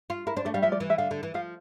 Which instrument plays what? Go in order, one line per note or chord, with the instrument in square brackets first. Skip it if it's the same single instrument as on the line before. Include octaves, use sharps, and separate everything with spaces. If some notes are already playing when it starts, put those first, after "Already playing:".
[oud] F4
[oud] E4 [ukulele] A#4
[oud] D4 [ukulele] C5
[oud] A3 [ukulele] D5
[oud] G3 [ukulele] F5
[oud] F3 [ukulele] E5
[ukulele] D5
[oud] E3
[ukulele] E5
[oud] D3 [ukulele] F5
[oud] D3
E3
[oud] F3 [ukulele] F5